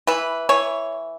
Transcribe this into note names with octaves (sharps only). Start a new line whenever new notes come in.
E3 B4
E3 C#5